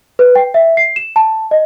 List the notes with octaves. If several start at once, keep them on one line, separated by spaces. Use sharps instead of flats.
B4
G5
E5
C7
E7
A5
D#5